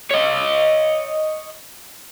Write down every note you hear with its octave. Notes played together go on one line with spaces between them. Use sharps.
C#5 D#5